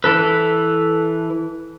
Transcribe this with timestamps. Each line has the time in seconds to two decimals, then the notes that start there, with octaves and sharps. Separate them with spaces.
0.04 E3 A4 B4